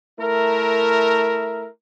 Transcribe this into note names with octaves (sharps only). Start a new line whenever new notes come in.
A3 E4 A#4 E5